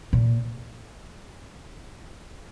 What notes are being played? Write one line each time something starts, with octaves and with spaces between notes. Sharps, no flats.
A#2